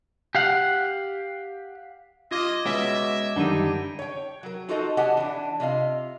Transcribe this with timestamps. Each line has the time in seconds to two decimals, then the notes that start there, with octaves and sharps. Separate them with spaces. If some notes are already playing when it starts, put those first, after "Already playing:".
0.35 G4 F5 F#5
2.31 F4 D#5 D6 G#6 A#6
2.65 B2 G#3 C#4 D#5 E5 B6 D7
3.36 F#2 D3 D#3 G3 D#4 D#7 G7
3.99 C#5 G5
4.43 F#3 A#4
4.69 D#4 F4 F#4 A4 D5 D#5
4.97 G4 C#5 D#5 F#5 G#5 A5
5.17 E3 D4
5.60 C3 F4 D#5 F5